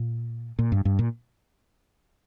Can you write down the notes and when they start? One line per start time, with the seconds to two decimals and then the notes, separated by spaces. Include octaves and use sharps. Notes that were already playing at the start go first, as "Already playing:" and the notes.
Already playing: A#2
0.59 A#2
0.72 G2
0.85 G2
0.99 A#2